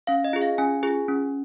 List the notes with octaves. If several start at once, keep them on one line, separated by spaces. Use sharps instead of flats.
C#4 F5
D#5
F4 G#4
F5
C#4 G#5
F4 G#4
C#4